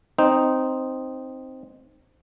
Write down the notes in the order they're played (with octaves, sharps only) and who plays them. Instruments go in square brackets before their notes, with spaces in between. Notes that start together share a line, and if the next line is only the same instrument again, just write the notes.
[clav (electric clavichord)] C4 D#4